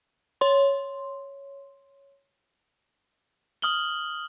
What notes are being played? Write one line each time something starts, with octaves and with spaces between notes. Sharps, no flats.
C#5 C6
D#6 F6 F#7 G7